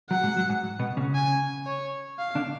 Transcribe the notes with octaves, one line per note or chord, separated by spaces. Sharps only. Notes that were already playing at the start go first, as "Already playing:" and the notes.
F#3 F#5
G#2 G#3
F#3
G#2 G#3
B2 B3
C#3 C#4
G#5
C#5
F5
D3 D4